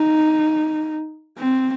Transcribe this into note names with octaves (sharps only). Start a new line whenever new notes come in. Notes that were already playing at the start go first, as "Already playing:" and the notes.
Already playing: D#4
C4